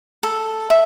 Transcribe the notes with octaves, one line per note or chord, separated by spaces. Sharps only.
A4
E5